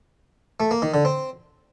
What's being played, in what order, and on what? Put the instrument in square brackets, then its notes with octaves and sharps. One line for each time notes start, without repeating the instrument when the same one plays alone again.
[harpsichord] A3
A#3
D#3
D3
C4